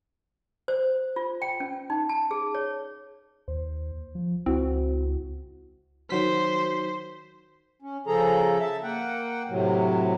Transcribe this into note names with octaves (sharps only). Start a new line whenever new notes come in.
C5
F4
G5
C#4
D#4
A5
G#4
C#5
D#2 C5
F3
C#2 C4 E4 F#4
D#3 F#3 C5 B6
C#4
C#3 F3 G#4 A4 A#5
E5 A5
A#3 F#5 G5
A2 C3 F#3